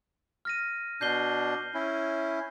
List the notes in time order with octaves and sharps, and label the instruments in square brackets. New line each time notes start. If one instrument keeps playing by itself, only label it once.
[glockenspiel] F6 A#6 D#7
[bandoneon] B2 D4 [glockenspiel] G6 C7 G7
[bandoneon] C#4 E4